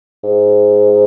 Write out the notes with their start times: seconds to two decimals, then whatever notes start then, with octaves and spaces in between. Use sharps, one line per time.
0.24 G#2